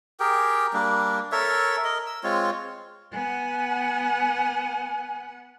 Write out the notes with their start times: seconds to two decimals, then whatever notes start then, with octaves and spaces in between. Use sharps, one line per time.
0.20 G4 G#4 A#4 G5
0.73 G3 A#3 D4
1.32 A4 A#4 C#5 E5
1.84 A#4 D#5
2.06 E6
2.23 G#3 C4 F4 C#5
3.13 B3 F#5 G#5